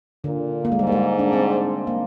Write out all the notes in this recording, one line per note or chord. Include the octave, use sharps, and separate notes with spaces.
A#2 D3
A#3
G#3
G#2 G3
A#3
G#3
D4
C4
A#3